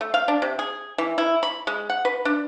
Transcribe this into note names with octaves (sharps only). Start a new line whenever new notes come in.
A3
F5
D4
C3
G#4
E3
E4
B5
G#3
F#5
B4
D4